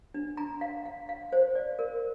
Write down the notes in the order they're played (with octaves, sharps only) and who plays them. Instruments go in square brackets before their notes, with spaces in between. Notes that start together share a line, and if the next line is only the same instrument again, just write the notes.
[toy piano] D4
A#5
F5
F5
F5
C5
D5
A#4